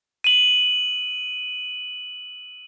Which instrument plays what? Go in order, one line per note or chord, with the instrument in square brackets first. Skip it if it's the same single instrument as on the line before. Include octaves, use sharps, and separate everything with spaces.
[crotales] D#7 F#7